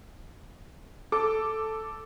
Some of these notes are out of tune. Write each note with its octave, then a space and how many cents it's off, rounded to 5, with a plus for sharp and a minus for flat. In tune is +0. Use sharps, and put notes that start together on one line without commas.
A4 +0 D6 +0